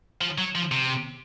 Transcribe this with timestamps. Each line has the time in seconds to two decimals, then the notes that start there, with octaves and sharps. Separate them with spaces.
0.21 F3
0.38 F#3
0.55 F3
0.72 C3